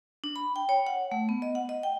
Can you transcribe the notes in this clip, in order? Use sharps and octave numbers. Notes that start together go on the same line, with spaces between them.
D4
B5
G5
C#5
F#5
A3
B3
D#5
F#5
D#5
G5